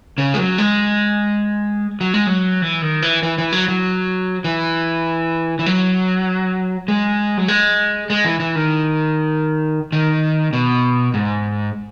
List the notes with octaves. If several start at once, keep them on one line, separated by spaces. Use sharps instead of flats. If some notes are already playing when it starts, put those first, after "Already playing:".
C#3
G#3
F#3
G#3
F#3
G#3
F#3
E3
D#3
E3
E3
E3
F#3
F#3
E3
E3
F#3
G#3
F#3
G#3
G#3
E3
E3
D#3
D#3
B2
G#2